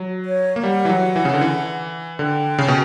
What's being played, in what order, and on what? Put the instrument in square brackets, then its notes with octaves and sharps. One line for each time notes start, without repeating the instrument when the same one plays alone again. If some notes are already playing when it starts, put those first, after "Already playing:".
Already playing: [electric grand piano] F#3
[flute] C#5
[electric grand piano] A#3
[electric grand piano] G3 [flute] F#5
[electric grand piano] E3
F#3
E3
C#3
D3
E3
[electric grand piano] D3 [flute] G5
[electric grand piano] C#3
B2